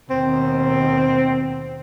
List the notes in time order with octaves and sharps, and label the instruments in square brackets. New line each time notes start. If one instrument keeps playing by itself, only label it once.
[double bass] D#2 B2 [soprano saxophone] C4